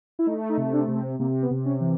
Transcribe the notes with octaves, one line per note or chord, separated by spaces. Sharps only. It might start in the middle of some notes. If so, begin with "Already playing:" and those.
E4
A3 D#4
D#4
C3
D4
C3
C4
C3 A#3
B3
C3
C#4
E3